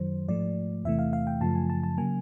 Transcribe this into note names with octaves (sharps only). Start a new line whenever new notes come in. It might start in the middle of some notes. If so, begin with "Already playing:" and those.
Already playing: F#2 D#3 F#3 C5
G#2 F3 A3 D5
E2 C3 E3 A3 E5
F5
F5
G5
F#2 C#3 F3 A3 A5
G#5
A5
A5
C#3 F#3 A#3 G#5